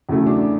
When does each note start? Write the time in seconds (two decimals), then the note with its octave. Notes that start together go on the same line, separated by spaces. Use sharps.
0.09 E2 C#3 F#3 A3 E4
0.26 D4